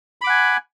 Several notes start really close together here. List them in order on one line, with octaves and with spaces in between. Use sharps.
B5 D6 F#5 G#5